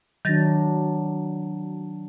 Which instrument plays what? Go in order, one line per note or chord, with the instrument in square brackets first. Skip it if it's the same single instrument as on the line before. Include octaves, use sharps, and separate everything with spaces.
[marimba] D#3 A6 A#6 [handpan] F#3 D4